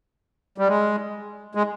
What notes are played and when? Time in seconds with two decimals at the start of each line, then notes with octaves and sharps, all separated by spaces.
0.58 G3
0.68 G#3
1.55 G#3